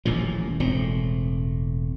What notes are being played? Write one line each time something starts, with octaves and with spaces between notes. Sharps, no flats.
D#1 A1 A#2 F3
E1 A2 C4